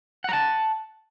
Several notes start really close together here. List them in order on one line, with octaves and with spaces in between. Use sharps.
F#5 A#5 A5